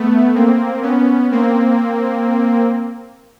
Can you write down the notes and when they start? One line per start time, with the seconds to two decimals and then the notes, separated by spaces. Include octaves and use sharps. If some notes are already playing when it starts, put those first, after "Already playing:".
Already playing: A3 B3
0.35 A#3 C4
0.82 B3 C#4
1.31 A#3 C4